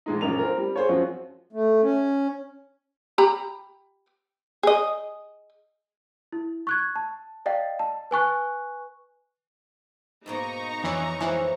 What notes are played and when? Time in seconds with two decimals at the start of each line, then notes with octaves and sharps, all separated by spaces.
0.06 A#1 G#3 D#4
0.21 A#1 F#2 A#4 F7
0.39 C4 A#4
0.58 G3
0.76 G#4 C5 C#5
0.89 F#2 F3 C4 F#4
1.53 A3
1.83 C#4
3.18 G4 A#5 B5
4.63 G#4 D#5
6.32 E4
6.67 C#6 F#6 G#6
6.96 A5
7.46 D5 D#5 F5 G5
7.79 A5
8.11 B4 G#5 C#6 F#6
10.26 G#2 B2 A#3 D#4 A#5 C#6
10.84 F2 E3 C#5
11.20 E3 F3 G#3